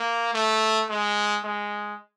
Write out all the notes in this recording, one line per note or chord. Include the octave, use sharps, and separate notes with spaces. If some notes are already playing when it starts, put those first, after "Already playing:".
Already playing: A#3
A3
G#3
G#3